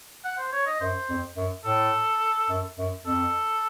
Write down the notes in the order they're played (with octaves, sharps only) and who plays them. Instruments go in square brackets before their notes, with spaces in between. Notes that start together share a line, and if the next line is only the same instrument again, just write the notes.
[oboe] F#5
C5
C#5
D#5
[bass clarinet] F#2 [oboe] C5
[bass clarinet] F2
F#2
[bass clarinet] A2 [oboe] A4
[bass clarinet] F#2
F#2
[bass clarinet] F2 [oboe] A4